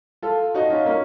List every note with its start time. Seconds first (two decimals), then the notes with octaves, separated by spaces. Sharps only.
0.23 F4 A4
0.54 D#4 F#4
0.70 C#4 F4
0.86 A#3 C#4